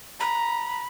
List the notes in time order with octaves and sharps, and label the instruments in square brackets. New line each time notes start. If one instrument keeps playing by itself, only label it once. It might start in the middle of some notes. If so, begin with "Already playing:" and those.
[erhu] A#5 [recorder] B5